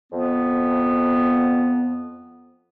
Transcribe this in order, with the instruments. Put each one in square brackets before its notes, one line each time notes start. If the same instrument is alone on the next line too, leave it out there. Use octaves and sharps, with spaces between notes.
[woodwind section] F2 B3